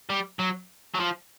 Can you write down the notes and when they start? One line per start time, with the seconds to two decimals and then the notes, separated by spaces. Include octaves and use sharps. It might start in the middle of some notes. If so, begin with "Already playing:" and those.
0.10 G3
0.39 F#3
0.94 F#3
1.00 F3